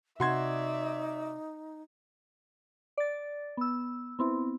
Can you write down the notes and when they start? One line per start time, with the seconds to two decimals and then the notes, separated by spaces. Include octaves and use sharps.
0.20 C3 C4 D#4 F#4 D5 E5 C6 G#6
2.98 D5 A6
3.57 B3 E6
4.19 B3 C4 E4